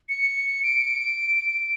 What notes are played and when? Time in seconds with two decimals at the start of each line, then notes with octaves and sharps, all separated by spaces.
0.09 C#7
0.63 D7